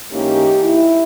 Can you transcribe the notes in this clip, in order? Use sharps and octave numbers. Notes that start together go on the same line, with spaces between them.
G#2 E3 A#3 C#4 D#4 G4
E4